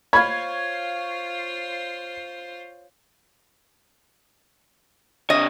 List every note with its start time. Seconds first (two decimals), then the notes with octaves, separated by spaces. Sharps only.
0.13 F4 C5 C#5 F5 B5 G#6
5.30 C3 C#5 D#5